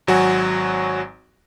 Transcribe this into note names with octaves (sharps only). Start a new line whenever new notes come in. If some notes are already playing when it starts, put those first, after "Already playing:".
G#1 F#3 F#4 G#5